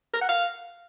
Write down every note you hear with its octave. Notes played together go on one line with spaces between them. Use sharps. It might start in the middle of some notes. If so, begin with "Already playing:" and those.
A#4
F#5
F5